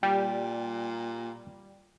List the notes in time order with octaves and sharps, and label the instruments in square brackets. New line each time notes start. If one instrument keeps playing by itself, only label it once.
[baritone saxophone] A#2 [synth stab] G3 [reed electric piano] G5